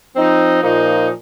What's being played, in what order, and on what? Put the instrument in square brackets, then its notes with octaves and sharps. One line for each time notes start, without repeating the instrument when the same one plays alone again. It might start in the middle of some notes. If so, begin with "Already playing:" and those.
[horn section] F3 C4 D#4
A#2 F3 A#3 D#4